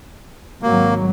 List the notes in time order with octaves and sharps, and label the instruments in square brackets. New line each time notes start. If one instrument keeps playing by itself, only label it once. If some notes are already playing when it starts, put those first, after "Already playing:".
[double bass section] G#1 F#3 [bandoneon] A#3